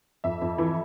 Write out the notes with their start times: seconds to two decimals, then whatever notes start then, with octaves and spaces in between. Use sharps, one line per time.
0.24 F2 E5
0.42 F2
0.58 E3